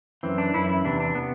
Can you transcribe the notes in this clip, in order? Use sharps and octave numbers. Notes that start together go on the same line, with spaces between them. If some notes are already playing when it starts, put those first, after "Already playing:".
F#2 E3 C4
D4
F#2 E3 E4
E4
E2 C3 E3 D4
D4
C3 B3